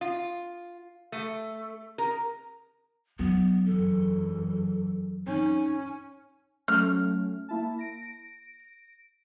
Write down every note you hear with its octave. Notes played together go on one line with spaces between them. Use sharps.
F4
A3
A#4
F#3 B3 D4
F#1 E2 A4
C#4 D#4
F#3 A3 C#4 F6
A#3 E4 A5
A#6 D7